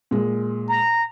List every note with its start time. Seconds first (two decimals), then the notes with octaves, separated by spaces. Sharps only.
0.11 A#2 G#3
0.68 A#5